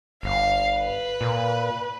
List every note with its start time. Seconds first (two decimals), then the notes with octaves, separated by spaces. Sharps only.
0.23 G1 F5
0.78 B4
1.21 A#2